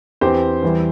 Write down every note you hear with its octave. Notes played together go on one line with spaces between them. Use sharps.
E2 E3 C4 G4 C5
E2 E3 G3